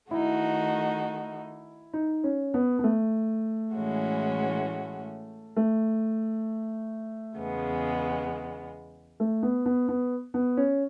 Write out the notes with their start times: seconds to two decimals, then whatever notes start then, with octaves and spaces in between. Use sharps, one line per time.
0.11 D#3 A3 D#4 E4 F#4
1.93 D#4
2.24 C#4
2.54 B3
2.79 B3
2.84 A3
3.74 A2 E3 G#3 C#4 F#4
5.56 A3
7.38 E2 C#3 G#3 B3
9.20 A3
9.43 B3
9.66 B3
9.88 B3
10.34 B3
10.57 C#4